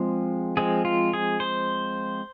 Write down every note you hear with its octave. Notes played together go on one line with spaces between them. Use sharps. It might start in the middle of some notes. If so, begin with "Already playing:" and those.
Already playing: F3 G#3 C4
F3 G#3 C4 G#4
F4
G#4
C5